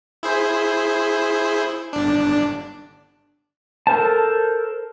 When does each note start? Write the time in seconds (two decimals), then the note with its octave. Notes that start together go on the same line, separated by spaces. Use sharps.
0.23 E4 G#4 C5
1.93 G1 D4
3.87 A4 A#4 C5 A5